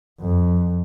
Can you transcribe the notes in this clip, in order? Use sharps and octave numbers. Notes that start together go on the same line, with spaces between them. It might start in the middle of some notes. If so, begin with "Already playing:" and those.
F2